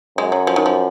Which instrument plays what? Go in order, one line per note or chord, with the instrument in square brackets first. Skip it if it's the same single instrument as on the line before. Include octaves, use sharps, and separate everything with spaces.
[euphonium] F#2 [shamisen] G#3
[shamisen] F#3
F3
D#3
F3